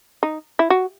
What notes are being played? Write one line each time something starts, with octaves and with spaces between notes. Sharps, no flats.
D#4
E4
F#4